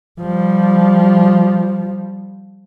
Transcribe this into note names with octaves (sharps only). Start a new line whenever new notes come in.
F3 G3